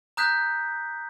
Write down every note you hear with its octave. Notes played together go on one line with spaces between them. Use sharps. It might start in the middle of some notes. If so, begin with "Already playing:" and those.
A#5 D#6 F#6 G6 B6